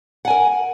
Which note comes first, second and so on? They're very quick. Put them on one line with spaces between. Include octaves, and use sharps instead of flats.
F#5 G#5 A#4